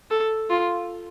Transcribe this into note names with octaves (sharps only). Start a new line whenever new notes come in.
A4
F4